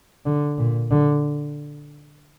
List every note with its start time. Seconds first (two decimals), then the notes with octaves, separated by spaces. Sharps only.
0.26 D3
0.58 A#2
0.91 D3